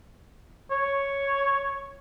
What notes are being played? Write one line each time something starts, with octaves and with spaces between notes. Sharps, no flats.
C#5